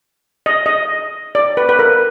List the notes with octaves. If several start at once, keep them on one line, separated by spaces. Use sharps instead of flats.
D#5
D#5
D5
B4
B4
A#4